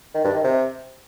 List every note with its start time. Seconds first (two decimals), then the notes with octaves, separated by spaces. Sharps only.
0.15 D#3
0.24 G2
0.34 D#3
0.44 C3